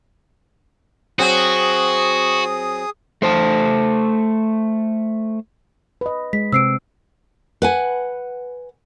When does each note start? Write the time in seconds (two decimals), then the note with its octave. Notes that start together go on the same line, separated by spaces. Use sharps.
1.19 F#3 C4 F#4 G#4 D#6
3.22 A3 C5 A5
6.01 B4 D#5
6.33 G#3 B6
6.53 C3 C4 E6 C7 D7
7.62 B4 F#5 G#5